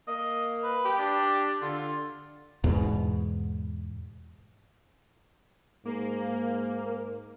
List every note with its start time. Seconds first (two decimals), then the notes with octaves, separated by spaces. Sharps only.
0.07 A#3 D#5
0.63 B4
0.85 G4
0.98 D4
1.62 D3 F4
2.64 E2 G#2 B2
5.85 G#2 A#3